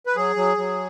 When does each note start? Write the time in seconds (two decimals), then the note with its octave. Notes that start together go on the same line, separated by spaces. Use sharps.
0.06 B4
0.16 F#3 G#4
0.36 F#3
0.57 F#3